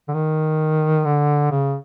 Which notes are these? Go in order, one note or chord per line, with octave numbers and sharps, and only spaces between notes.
D3
D#3
D3
C#3